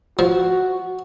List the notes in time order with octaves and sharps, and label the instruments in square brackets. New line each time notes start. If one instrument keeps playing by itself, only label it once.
[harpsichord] F3 [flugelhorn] F#4